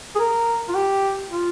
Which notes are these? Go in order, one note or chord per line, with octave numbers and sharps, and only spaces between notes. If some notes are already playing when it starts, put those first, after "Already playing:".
G#4
A#4
F4
G4
F4